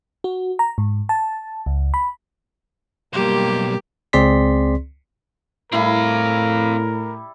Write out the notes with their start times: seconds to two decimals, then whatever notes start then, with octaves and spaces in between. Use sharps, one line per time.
0.24 F#4
0.59 A#5
0.78 G#2
1.09 A5
1.66 C#2
1.94 B5
3.13 B1 G3 A#3 G4 C5
4.13 C#2 C4 G#4 D5 C6 B6
5.72 A2 G3 C4 E4 A#4 F5